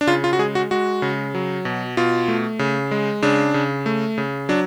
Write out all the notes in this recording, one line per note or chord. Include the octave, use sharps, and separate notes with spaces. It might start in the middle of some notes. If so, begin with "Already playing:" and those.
D4
C#3 F4
F4
F#4
G#3 G#4
F#4
G#3 F#4
C#3
F#3
B2
B2 F4
A3
C#3
G#3
C#3 D4
C#3
A3
C#3
F#3 D4